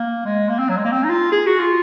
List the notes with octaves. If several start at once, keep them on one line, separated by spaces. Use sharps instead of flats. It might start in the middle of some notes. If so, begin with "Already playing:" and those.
Already playing: A#3
G#3
A#3
C4
F#3
G#3
A#3
C4
D#4
F4
G#4
F#4
F4